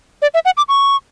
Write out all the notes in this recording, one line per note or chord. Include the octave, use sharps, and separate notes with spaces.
D5
E5
F#5
D6
C#6